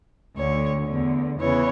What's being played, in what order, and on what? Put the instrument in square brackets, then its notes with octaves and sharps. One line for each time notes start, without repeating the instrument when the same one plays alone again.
[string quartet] D2 D3 C#5
E2 D3
E2 C#3 E3 C#5